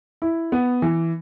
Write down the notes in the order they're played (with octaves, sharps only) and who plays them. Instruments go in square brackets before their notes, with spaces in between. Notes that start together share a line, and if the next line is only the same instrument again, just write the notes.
[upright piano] E4
B3
E3